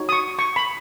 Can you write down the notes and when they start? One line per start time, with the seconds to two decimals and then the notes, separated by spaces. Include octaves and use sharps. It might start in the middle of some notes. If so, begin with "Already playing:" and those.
Already playing: D#4 F#4 C#5
0.09 D#6
0.12 C#6
0.39 C#6
0.56 B5